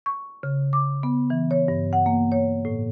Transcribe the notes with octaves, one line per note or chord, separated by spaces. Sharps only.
C#6
C#3
D6
B3
E3
C#5
G2
F#5
A#3
C#5
A2